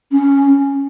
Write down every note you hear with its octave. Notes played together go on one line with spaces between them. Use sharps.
C#4